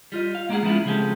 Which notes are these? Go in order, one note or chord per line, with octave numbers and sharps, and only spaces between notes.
G3 F4 D#5
F5
G#3 A#3 D4 E4 G#4 F#5
F3 G#3 B3 C#4 E4 F4
C#3 F3 G#3 C4 G4 A4